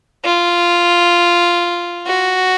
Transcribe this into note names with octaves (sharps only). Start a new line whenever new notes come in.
F4
F#4